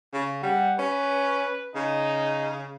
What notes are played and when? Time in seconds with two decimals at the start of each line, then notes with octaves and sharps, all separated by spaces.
0.13 C#3
0.43 G3 F#5
0.79 C#4 B4
1.75 C#3 D#4